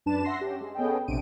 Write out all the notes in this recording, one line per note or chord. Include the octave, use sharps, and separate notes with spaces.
F#2 D4 B4 A5 E7
E5 F#5 C6 A#6 C7
C#4 G4
G#3
B3 C#4 G#4 A4 D#5 G5
A#1 C3 C4 D4 D7 D#7